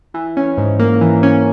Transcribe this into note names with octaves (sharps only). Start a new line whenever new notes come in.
E3
C#4
G#2
A#3
E3
C#4